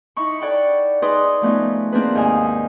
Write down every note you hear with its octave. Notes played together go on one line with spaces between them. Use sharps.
D#4 E4 B5 C#6
A4 C#5 D5 F#5 G5 B5
D#4 G#4 B4 D5 C6 D#6
F3 A3 B3 C#4 D#4
A#3 C4 D4 E4 G#4 B4
D#2 G#2 F5 G#5 D#6